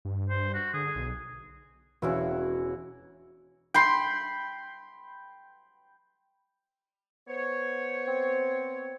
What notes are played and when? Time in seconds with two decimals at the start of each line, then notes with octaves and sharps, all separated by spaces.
0.05 G2
0.30 C5
0.54 F#4
0.74 D3 G#4
0.96 B1
2.02 E1 C#4 E4 F#4
3.74 G5 B5 C6
7.28 B3 C5 C#5
8.08 C4